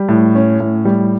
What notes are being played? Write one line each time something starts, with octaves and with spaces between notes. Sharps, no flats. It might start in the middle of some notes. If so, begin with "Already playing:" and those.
Already playing: G3
A2
C#4
A2
G3